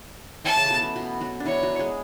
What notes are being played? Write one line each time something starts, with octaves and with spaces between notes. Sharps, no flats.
E3 E4 A5
C#3 C#4
B2 A3 B3
A3
B2 B3
F#3 F#4
D4
E3 E4 C#5
F#3 F#4
G#3 G#4